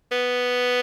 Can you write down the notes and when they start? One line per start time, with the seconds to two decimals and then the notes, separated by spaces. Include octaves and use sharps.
0.12 B3